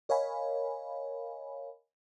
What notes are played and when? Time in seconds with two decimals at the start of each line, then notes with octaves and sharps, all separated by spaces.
0.09 A#4 C#5 D#5 F5 G#5 B5